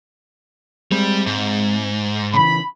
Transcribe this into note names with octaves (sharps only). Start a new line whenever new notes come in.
G3 G#3 C4
G#2
C#3 E3 B5